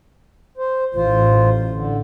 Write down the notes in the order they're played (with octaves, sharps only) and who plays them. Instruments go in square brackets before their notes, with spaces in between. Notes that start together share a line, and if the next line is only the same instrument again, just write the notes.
[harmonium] C5
[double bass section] A1 [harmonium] F4 C5
[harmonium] D3